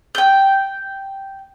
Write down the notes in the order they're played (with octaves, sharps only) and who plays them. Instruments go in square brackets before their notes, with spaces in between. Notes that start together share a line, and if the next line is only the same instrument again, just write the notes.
[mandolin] G5 G6